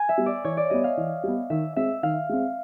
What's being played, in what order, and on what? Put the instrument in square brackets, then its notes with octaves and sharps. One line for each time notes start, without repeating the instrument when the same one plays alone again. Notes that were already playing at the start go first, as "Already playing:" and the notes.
Already playing: [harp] G#5
E5
[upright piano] G3 B3
[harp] D5
[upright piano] E3 [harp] C#5
[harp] D5
[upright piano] G3 B3 [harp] D#5
[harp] F5
[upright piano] E3
G3 B3
[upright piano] D#3 [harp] E5
[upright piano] G#3 C4 [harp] E5
[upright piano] D#3 [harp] F5
[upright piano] G#3 C4